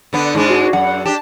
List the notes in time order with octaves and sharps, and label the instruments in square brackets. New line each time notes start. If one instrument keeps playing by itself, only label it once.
[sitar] D3 B3 D4
G#2 G#3 D4
[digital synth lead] F#4
[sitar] F#2 [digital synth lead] F#5
[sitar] D4 G4 [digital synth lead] A5